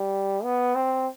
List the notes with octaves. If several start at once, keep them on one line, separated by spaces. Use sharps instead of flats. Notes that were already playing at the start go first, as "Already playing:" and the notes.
Already playing: G3
B3
C4